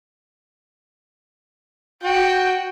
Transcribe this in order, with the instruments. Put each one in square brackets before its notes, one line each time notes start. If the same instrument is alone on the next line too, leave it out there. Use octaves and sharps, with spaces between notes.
[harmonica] F#4 [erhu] G5